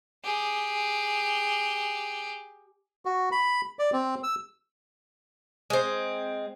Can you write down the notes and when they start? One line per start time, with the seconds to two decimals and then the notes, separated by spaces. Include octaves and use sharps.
0.24 G4 G#4
3.05 F#4
3.32 B5
3.79 D5
3.93 C4
4.23 E6
5.70 G#3 C4